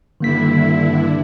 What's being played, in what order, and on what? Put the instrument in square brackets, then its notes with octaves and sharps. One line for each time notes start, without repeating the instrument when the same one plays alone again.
[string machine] G2 D3 E4 [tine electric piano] D#3 A#3 B6